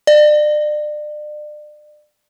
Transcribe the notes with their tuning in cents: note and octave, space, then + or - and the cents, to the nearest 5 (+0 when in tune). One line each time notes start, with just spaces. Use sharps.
D5 +35